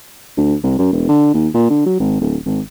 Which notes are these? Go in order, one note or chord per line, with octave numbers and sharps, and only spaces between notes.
D2
C2
F#2
E1
D3
D#2
A#2
D3
F#3
G#1
D1
G#1